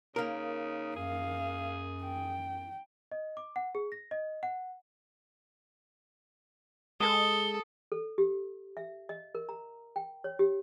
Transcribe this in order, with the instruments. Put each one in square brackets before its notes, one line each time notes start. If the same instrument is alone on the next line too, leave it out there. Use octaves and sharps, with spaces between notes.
[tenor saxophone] C#3 [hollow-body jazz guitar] A#3 A#4 [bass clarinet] D#4
[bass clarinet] F#2 [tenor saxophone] G#4 [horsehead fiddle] F5
[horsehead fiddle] G5
[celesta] D#5
D6
F#5
G#4
A#6
D#5
F#5
[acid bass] G#3 [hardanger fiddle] A4 [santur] D#6 [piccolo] G7
[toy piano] A4
G4
E5
D#5
A#4
A#5
G5
C#5
G4